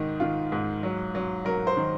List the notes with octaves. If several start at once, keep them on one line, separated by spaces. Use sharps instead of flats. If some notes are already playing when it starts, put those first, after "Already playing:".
Already playing: G#2 D#3 D#4
D#3 F4
G#2
F#3
F#3
F#3 A#4
C5
D#3